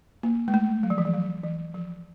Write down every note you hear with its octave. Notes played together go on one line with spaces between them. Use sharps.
A#3
G#3
A3
F#3
F3
E3
F3
F#3
E3
F3